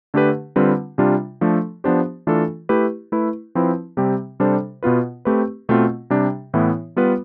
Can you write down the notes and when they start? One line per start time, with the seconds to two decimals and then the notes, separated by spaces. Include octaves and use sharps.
0.14 D3 A3 D4 G4 B4
0.56 D3 G3 C4 F4 B4
0.98 C3 G3 D4 F4
1.41 F3 A3 D4 A4
1.84 F3 B3 D4 G4 C5
2.27 E3 A3 D4 F4 A4
2.69 A3 E4 G4 B4
3.12 A3 E4 B4
3.55 F3 C4 E4 B4
3.97 C3 G3 C4 G4
4.40 C3 G3 D4 A4 C5
4.83 B2 B3 F4 B4
5.25 A3 C4 G4 B4
5.69 B2 A3 C4 F4
6.10 C3 G3 D4 G4
6.54 A2 E3 B3 E4
6.96 G3 B3 F4 B4